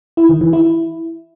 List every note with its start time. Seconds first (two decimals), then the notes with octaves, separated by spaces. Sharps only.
0.17 E4
0.29 D#3
0.41 E3
0.53 E4